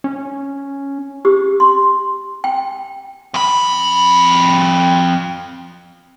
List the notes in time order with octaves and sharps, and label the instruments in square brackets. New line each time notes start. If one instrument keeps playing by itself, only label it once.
[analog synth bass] C#4
[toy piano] G4
C6
G5
[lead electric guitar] F2 B5